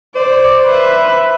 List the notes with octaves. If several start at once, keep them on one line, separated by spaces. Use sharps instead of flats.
C5 D5
B4 E5